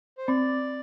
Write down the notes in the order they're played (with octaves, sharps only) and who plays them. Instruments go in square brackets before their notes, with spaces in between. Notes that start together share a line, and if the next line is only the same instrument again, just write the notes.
[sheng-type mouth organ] C5
[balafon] C4 [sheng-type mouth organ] D5